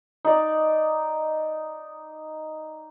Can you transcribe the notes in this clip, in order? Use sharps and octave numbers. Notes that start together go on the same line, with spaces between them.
D#4 D5